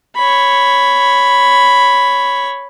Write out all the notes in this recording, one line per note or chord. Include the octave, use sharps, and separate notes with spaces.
C#5 B5